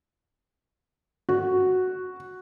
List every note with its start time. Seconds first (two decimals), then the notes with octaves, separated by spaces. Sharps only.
1.29 F#4